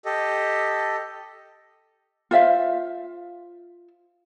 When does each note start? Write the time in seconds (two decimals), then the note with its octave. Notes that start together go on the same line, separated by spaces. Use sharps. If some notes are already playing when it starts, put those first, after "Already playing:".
0.05 G4 A4 D#5
2.31 F4 C5 E5 F5